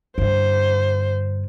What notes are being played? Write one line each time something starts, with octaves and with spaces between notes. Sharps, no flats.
G2 D3 C5